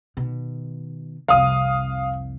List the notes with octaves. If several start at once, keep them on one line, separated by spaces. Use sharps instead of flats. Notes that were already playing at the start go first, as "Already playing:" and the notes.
B2 D#3
C2 F2 F5 D#6